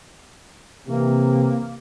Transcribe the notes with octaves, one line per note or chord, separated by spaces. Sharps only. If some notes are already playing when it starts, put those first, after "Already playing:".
C3 E3 A#3